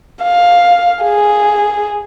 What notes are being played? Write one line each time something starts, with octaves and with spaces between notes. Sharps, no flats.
F5
G#4